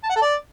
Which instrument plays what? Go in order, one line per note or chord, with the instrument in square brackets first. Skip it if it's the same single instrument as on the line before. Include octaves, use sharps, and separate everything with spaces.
[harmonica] A5
F#5
A4
D5